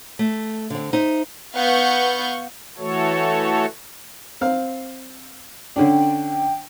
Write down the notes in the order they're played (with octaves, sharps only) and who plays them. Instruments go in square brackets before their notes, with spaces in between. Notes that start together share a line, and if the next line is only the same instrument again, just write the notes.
[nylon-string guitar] A3
D3 C4
D#4 C5 E5
[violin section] B3 F5 F#5 C#6 G6
[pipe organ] E3 A3 F#4 A4 C#5
[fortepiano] C4 F5
[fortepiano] D3 C#4 D4 [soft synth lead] G5